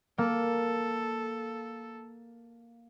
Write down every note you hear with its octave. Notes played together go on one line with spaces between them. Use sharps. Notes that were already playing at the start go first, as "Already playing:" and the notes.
A#3 A4